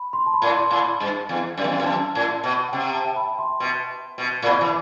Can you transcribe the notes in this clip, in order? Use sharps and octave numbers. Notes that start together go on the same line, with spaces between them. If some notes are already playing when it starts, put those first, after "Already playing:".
Already playing: B5
C6
A5
B5
A2
C6
A2
B5
G2
E2
F#2
E2
F#2
E2
F#2 A5
A2
B2
F#5
C3 G5
A5
B5
C6
B2
B2
A2
B2 B5
E3